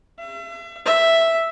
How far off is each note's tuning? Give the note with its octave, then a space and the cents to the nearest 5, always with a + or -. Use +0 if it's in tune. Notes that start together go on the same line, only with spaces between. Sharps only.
E5 +40
E5 +0